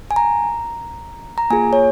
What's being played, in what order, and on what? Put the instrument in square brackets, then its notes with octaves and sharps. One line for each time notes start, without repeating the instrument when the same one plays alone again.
[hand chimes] G#5
A#5
A#5
A#3 F4 G#4 G#5
C#5